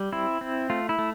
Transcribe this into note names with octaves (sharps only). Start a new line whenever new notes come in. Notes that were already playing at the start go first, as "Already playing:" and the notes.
Already playing: G3
C4 E4
C4
A3 F4
E4
A3